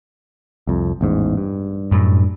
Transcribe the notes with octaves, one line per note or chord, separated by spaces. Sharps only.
C2 F2
A1 E2 G#2
G2
F#2 A2